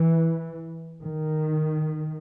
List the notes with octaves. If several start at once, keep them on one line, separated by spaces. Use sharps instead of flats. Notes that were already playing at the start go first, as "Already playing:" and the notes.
Already playing: E3
D#3